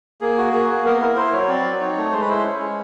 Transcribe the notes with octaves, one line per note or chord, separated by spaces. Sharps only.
A#3 G#4
F#4
A#3 G#4
A#3
B3 A#4
E4 A#4
E4 C5
F#3 C#5
C4 D5
F#3
D#4 C#5
A3
G#3 C5
B4
E4 C5
C#4
G#3